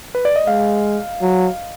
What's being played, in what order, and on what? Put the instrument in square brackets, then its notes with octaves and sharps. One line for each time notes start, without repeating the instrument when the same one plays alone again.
[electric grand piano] B4
D5
D#5
[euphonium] G#3 [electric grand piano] F5
[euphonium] F#3